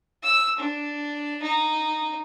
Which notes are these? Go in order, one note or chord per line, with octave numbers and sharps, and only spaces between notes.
E6
D4
D#4